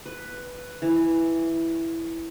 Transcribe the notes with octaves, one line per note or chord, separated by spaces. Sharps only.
B4
E3